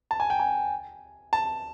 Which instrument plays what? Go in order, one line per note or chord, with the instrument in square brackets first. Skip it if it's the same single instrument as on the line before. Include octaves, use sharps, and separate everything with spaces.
[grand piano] A5
G#5
G5
G#5
A5